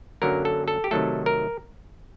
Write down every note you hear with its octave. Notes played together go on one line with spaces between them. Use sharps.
F#2 D3 F#3 A#3 A#4
A4
A4
G4
C3 D#3 F#3 A3 A4
A#4